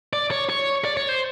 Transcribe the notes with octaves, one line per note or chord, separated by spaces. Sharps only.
D5
C#5
C#5
D5
C#5
C5